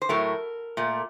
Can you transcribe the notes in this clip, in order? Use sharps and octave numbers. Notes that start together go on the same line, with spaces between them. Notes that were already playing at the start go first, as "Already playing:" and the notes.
C5
A2 F#3 A3 A#4
A#2 A3